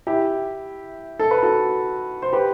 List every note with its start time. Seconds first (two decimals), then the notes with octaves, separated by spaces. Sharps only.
0.07 E4 G4
1.19 A4
1.31 B4
1.43 F#4 A4
2.22 C5
2.33 G4 B4